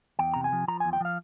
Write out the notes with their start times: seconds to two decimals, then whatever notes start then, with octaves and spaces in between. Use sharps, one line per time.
0.19 E2 G5
0.34 C3 A#5
0.44 G#5
0.52 F3
0.68 F3 A#5
0.80 E2 G#5
0.93 G5
1.00 F3 F5